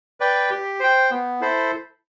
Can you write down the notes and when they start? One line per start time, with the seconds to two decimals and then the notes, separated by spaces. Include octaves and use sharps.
0.20 B4 D5 G5
0.50 G4
0.80 C5 G5
1.11 B3
1.41 E4 A4 C5